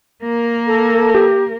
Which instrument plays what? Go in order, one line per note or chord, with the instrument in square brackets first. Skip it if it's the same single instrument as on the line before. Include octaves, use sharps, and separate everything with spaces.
[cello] A#3 A#4
[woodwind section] A4
[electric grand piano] G4